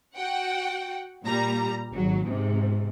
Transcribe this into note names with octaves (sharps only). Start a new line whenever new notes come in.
F#4 F#5 G5
A#2 G3 A#5
G#1 F#3
G#2 C3